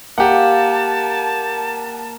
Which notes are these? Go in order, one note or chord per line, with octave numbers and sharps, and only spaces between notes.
A#3 G4 F#5 A5